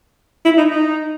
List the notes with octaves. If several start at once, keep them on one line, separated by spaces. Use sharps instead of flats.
E4
D#4
D#4